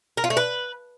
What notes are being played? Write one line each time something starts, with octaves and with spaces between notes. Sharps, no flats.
A#4
F4
A3
B4